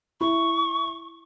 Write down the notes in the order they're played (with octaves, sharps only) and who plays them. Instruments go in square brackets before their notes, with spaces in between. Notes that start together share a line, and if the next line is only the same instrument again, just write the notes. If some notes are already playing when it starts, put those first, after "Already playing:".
[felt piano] E4 [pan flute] C#6